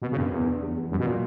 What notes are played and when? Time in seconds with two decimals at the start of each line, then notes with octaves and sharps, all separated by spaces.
0.02 B2 B3
0.12 C#3
0.17 G2 B3
0.22 F#2
0.32 E2 B3
0.47 D4
0.62 E2
0.77 E2
0.91 F#2 F#3
0.99 B2
1.06 A#2